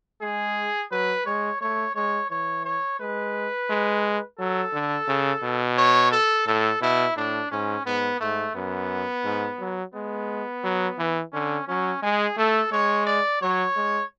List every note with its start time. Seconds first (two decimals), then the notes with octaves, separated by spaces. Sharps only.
0.21 G#3 G#4
0.91 F#3 B4
1.26 G#3 C#5
1.61 A3 C#5
1.96 G#3 C#5
2.30 E3 C#5
2.65 C#5
3.00 G#3 B4
3.70 G#3
4.39 F#3 A4
4.73 D3
5.08 C#3
5.43 B2
5.77 C#5
6.12 A4
6.46 A2 A4
6.81 B2 E4
7.16 A2 D4
7.51 G#2 C#4
7.86 G#2 B3
8.20 G#2 A3
8.55 F#2 B3
9.24 G#2
9.59 F#3
9.94 G#3 B3
10.64 F#3
10.98 E3
11.33 D3 C#4
11.68 F#3 C#4
12.02 G#3 G#4
12.37 A3 A4
12.71 G#3 C#5
13.07 D5
13.42 F#3 C#5
13.76 G#3